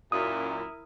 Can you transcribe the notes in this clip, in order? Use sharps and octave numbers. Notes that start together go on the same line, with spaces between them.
F#2 A#2 E4 A#4 D#6